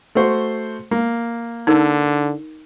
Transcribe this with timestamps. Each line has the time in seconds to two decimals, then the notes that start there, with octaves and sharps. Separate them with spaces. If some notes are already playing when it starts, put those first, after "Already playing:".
0.15 A3 F#4 C5
0.91 A#3
1.67 D3 D#4 A#4